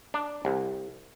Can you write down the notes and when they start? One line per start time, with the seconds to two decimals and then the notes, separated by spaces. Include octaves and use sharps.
0.14 D4
0.45 C2